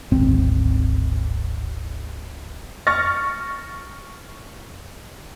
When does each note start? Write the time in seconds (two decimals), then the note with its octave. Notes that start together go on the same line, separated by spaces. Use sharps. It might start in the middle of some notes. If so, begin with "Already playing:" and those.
0.11 D1 G#1 C4
2.87 C#6 F6 A6 A#6